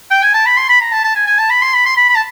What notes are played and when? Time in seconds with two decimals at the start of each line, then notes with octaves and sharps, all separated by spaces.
0.10 G5
0.23 G#5
0.34 A5
0.46 B5
0.57 C6
0.69 B5
0.81 A#5
0.92 A5
1.04 A5
1.16 G#5
1.27 G#5
1.39 A5
1.50 B5
1.62 C6
1.74 B5
1.86 C6
1.97 B5
2.09 B5
2.15 A5